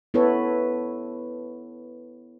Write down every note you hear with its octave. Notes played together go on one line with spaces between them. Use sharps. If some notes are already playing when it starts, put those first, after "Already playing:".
B3 E4 A4 B4 C#5